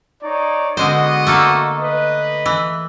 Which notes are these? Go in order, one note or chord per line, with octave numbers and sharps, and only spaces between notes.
D#4 C#5 D5
D3 G#3 B3 F#4 C5 D#5
A3 A#3 A4
B4 D#5
E3